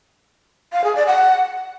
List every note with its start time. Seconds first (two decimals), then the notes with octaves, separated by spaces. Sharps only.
0.73 F5
0.84 G#4
0.95 D5
1.07 F#5